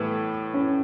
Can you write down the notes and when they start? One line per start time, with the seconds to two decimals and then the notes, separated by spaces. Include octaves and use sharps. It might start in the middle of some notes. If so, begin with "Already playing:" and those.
Already playing: A2 E3 G3 A3 B3
0.54 C#4